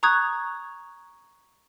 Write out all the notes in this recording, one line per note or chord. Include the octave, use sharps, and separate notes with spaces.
A#5 C#6 D#6 F#6 G#6